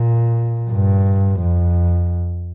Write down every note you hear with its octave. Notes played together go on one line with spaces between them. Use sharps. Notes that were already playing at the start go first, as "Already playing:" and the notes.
Already playing: A#2
G2
F2